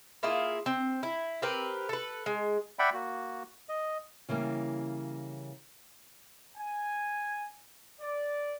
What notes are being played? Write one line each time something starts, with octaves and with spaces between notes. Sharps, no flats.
A#3 E4 F4 G#4
C4
E4
C4 G4 A#4 B4
A4 B4
G#3
D5 E5 F#5 G5 B5
A#3 F#4
D#5
C#3 E3 G3 A#3
G#5
D5